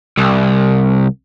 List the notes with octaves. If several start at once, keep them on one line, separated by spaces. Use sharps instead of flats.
C2